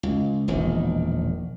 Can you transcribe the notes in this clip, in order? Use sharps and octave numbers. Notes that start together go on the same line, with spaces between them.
C#2
E1 A#1 D#3